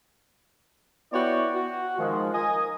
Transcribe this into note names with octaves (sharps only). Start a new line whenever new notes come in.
B3 E4 F#4 C#5 D5 G5
F#4
D#3 F3 G#3
A#4 D#5 G#5